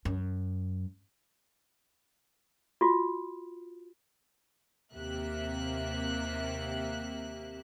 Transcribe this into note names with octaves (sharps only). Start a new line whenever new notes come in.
F#2
F4 F#4
D#2 C3 A#3 G4 E5 F#6